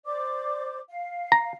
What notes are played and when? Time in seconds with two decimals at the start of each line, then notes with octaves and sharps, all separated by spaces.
0.05 C5 D5 D6
0.89 F5
1.32 A#5